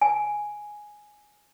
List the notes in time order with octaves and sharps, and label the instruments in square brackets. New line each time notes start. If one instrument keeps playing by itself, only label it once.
[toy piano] G#5